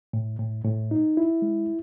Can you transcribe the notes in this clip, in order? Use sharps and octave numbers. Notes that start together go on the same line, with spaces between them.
A2
A2
A2
D#4
E4
G#3